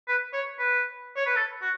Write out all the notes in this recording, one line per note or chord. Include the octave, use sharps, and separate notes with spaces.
B4
C#5
B4
C#5
B4
A4
F#4